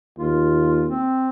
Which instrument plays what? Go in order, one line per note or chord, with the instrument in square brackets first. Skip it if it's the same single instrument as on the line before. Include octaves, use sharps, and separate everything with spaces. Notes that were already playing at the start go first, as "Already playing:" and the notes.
[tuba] D#2 [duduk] F4
[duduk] C4